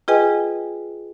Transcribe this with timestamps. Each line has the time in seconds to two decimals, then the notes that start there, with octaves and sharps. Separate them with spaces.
0.08 F4 G#4 B4 D#5 G5 G#5